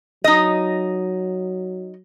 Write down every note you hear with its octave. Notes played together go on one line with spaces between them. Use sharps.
F#3 D#4 D#5